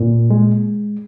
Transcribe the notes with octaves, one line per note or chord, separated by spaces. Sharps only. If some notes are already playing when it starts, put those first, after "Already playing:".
Already playing: A#2
G#3